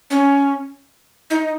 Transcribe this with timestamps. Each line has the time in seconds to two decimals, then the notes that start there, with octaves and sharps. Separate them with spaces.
0.10 C#4
1.30 D#4